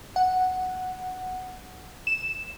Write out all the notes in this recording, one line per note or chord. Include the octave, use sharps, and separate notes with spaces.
F#5
E7